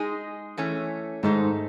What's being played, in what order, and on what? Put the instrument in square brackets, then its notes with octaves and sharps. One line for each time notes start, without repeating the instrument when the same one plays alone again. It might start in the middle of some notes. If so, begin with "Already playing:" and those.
Already playing: [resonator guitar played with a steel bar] G#3 D#4 G#4
E3 A3 C#4
[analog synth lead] G#2 [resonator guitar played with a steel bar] D#3 A3 D#4